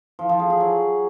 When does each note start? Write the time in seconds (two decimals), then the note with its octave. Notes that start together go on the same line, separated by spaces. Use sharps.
0.19 F3
0.29 F3
0.40 G#4
0.50 G#4
0.60 F#3